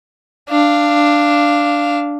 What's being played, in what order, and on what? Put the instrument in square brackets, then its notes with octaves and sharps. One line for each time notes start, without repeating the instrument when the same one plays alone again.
[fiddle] D4 F5